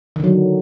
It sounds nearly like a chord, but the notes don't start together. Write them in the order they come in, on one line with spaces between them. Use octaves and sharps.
D#3 D3 F#3